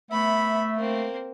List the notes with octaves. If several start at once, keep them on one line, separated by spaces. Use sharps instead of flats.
A3 B3 E5 B5
A#3 C4